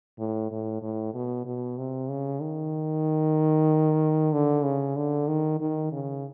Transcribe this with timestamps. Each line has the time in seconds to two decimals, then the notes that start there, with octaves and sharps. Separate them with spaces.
0.19 A2
0.51 A2
0.82 A2
1.14 B2
1.46 B2
1.78 C3
2.10 C#3
2.42 D#3
4.33 D3
4.64 C#3
4.97 D3
5.28 D#3
5.61 D#3
5.92 C#3